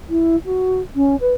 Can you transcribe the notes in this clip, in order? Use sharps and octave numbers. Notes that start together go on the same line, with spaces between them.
E4
F#4
C#4
B4